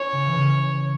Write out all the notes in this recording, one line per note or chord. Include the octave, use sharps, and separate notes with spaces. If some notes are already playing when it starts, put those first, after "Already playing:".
Already playing: C#4 E4 C#5
C#3
E3
C#3